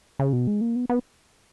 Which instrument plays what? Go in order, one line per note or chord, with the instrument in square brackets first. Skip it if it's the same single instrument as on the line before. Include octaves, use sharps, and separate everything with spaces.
[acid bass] C#3
B2
G#3
A#3
B3
B3